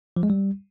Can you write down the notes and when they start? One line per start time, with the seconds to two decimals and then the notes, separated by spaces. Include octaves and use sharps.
0.16 F3
0.23 G#3
0.30 G3